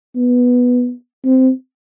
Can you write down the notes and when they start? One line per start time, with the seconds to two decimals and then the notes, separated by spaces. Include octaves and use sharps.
0.16 B3
1.25 C4